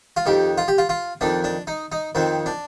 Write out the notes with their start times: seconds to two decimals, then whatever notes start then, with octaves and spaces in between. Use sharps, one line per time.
0.17 F4
0.26 F2 D#3 G4
0.58 F4
0.68 G4
0.78 F4
0.89 F4
1.21 F2 D#3 D4
1.44 D4
1.67 D#4
1.92 D#4
2.15 F2 D#3 C4
2.46 D4